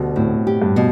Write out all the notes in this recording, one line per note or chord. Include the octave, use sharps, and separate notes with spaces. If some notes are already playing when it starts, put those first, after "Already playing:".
Already playing: D2 B2 G3
A2 C4
G4
G2
B2